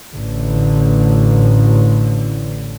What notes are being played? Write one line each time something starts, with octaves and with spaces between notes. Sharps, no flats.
A1 D3